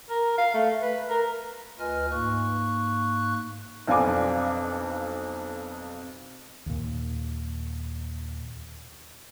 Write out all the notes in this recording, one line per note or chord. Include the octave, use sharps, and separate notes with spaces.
A#4
F5
A3
B4
A#4
D2 F4 B4 D#5 G#5 F6
G#2 A#3 C#6 F#6
B1 F2 D4 F5 G#5 D6
D#2 A#2